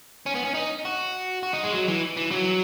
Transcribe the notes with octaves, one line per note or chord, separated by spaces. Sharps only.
C#4
B3
C#4
D#4
F#4
F#4
D#4
G#3
F#3
E3
E3
F#3